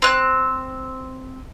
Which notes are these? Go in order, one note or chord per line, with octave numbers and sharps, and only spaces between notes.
C4 F#6